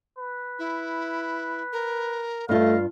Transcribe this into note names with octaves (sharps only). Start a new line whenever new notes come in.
B4
E4
A#4
G2 A3 F4 D#5 F5